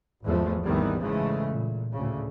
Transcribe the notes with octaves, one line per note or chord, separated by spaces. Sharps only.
G#1 E2 F3 G#3 A3 B3
G#1 D#2 D#3 E3 G3 B3
G#2 C#3 E3 G#3 A3
A#2
D2 A2 C#3